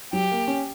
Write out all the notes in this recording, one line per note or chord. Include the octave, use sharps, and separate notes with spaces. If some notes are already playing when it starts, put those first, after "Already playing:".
F#3 G4
A#3
C#4